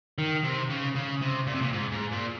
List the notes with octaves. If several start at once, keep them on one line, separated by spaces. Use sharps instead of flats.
D#3
C3
C#3
C#3
C3
A#2
C3
A#2
G#2
G#2
A#2